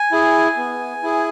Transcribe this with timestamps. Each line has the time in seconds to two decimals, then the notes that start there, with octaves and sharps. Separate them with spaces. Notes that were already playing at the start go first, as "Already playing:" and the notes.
Already playing: G#5
0.12 E4 G#4
0.57 B3
1.03 E4 G#4